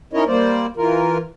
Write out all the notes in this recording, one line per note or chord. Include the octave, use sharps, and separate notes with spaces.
C#4 D#4 E4 A#4 C#5 D#5
G3 A#3 C5 D5
E3 F4 A#4